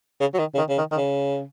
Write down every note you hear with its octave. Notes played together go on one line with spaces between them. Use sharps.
C#3
F#3
D#3
C#3
D#3
C#3
D#3
D#3
C#3